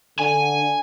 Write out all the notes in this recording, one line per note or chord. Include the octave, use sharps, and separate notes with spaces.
D3 G#5